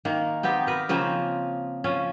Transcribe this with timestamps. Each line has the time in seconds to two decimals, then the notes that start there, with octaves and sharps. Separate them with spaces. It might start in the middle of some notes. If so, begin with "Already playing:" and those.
0.05 D#3 A#3
0.43 B3 C4 D#4 G4
0.67 A#4 B4
0.89 C#3 F3 A#3 C4
1.84 F3 C#4